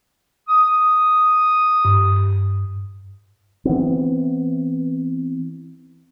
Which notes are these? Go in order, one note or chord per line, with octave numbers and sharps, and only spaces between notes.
D#6
G2
E3 B3 C4